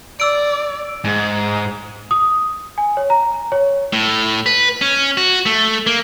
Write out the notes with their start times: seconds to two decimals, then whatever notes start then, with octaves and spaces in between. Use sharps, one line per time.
0.20 D5 E6 D7
1.04 G#2
2.11 D#6
2.78 G#5
2.97 C#5
3.10 A#5
3.52 C#5
3.93 A2
4.46 B4
4.81 C#4
5.17 F#4
5.46 A3
5.87 A#3